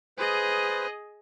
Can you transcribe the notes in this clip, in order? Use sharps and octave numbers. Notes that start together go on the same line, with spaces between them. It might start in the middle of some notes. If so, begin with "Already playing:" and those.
G#4 B4 C5 D#5